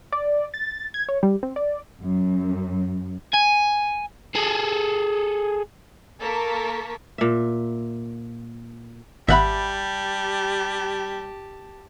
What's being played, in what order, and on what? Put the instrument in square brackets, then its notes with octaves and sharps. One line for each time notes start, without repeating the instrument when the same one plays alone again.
[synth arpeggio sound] D5
A6
G#6
C#5
G3
C4
D5
[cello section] F#2
[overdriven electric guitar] G#5
G#4 A4
[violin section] A#3 A4 A#4 A5 C#6 B6
[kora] A#2 E5
[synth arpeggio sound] G#1 [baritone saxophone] G3 [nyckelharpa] G4 A5 [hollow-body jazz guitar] E5 F#5 B5